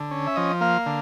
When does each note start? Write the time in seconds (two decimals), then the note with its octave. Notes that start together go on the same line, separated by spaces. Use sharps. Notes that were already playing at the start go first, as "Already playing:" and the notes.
Already playing: D3
0.11 C#4
0.27 E5
0.36 F3 D#5
0.61 A#3 F5
0.86 D3